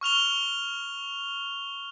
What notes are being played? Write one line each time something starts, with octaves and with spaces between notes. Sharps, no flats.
C#6 F6 F7 G7